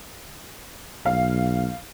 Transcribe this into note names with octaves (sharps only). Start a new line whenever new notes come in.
B1 F5